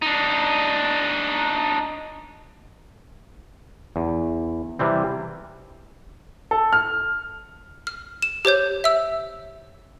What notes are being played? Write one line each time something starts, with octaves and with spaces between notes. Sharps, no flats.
D4 D#4
E2
C3 E3 G3 C4
A4
F6
F6
E7
G4 C5 C#5 G6
E5 E6